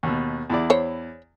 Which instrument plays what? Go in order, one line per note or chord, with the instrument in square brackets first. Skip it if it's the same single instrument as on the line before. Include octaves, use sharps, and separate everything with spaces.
[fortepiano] D#2 B2
E2 E4 D5
[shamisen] C5 C#5